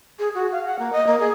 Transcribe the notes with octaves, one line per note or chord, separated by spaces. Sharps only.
G#4
F#4
F5
F#5
A#3
D#5
A#3
G#4